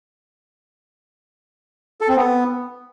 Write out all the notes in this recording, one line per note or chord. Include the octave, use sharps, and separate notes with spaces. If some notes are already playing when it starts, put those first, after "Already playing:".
A4
C4
B3